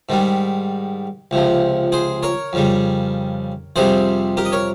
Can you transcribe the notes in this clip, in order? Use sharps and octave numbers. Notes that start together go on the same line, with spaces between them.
G#2 D#3 G3
C#2 C3 F3
G#4 C5
A#4 C#5
F2 C#3 G3
F2 C3 G3 G#4 C5
G4 A#4
D#5
A#4 C#5